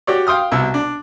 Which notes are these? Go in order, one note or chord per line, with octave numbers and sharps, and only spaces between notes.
F#4 G4 C#5 D5
F5 G5 C6 D#6 F6
C2 B2 E6
D4